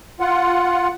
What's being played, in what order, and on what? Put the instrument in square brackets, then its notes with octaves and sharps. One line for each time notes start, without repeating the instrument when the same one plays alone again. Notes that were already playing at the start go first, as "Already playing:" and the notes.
[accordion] F4 F#5